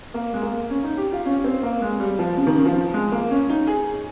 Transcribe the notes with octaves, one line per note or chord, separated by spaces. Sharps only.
A#3
G#3
A#3
C#4
D#4
G4
F4
C#4
C4
A#3
G#3
G3
F3
C#3
D#3
C#3
F3
G#3
A#3
C#4
D#4
G#4